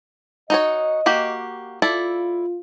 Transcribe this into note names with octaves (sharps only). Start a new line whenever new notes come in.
D#4 F#4 C#5 D#5
A#3 F#4 G4
E4 F4 A4 D5